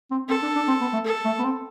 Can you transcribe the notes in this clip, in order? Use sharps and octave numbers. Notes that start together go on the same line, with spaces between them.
C4
C4 A4
D4
D4
C4
B3
A3
A4
A3
B3
C4